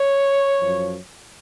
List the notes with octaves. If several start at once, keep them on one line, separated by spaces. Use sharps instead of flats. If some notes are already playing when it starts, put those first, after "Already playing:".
Already playing: C#5
F#2 F3